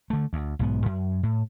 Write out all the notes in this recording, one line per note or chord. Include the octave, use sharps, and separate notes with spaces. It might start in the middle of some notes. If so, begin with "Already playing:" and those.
D3 A3
D2
B1 G#2 B3
F#2
A2